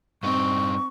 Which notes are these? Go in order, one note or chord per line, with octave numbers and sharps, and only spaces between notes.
G2 C4 D#4 C#6